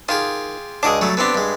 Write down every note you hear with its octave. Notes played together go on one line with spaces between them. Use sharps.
D#3 F4 G4 G#4
C#2 D4 F#4 G#4 D#5 D6
F#3 G3 A3
D3 B3 C4 D4 G4
G2 G#3